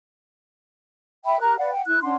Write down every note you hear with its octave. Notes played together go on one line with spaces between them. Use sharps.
E5 G5 B5
G4 A#4 A#5 F#6
B4 D5 F5 F#5
F#5 G5
E4 F#6
C#4 D4 F#5 C6